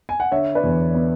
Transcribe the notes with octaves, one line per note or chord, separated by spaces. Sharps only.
G#5
F#5
D3 C#5 E5
B4 D5
E2
B3